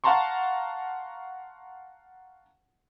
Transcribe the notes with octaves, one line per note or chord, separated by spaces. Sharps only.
F5 F#5 A5 A#5 C6 C#6